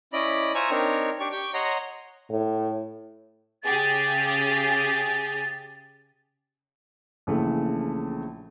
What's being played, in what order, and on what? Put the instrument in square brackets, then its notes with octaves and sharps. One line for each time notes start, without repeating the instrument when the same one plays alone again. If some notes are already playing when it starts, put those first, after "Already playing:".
[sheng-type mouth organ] C#4 E4 D5 D#5 B5
F4 C5 E5 G#5 A#5 C#6
C4 D4 D#4 A#4 C#5
D4 G4 D5 C#6
G4 G5 C#6
C#5 D#5 F#5 A#5 C6
[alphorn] A2
[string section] C#3 G4 G#4 [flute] A6
[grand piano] A#1 C#3 E3 A3